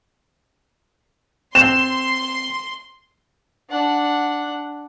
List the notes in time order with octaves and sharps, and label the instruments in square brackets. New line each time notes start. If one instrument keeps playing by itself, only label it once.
[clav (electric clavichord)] C4 [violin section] C6 [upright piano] E7
[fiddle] D4 F#5